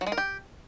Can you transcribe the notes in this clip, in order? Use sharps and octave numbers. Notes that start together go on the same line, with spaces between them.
F#3
G#3
A#4
G4